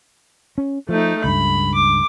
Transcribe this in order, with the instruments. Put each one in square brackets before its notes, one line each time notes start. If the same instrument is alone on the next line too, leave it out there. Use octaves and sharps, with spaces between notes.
[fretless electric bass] C#4
[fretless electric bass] F3 [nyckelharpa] A3 D#4
[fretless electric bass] C#2 G2 [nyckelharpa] B5
[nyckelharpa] D6